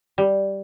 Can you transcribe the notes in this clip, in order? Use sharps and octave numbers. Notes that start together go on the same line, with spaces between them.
G3